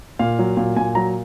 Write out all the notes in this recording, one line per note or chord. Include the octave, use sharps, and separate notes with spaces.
A#2 F5
F#3
A#2
A#2 G#5
F#3 A#5